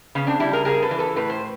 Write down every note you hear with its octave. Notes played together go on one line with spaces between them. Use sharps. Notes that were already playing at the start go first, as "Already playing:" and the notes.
C#3 B3 C#4
C4 D4
G3 D4 E4
G#4 A#4
C#3 G#4 A#4
A4 B4
E3
A4 B4
A2 B4
C5